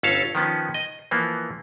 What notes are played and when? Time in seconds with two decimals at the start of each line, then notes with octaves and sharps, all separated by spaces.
0.03 G1 C#4 A4 C#5 F5 A5
0.35 D#3 F3 B3 C#4
0.74 D#5
1.11 E3 F3 A#3 B3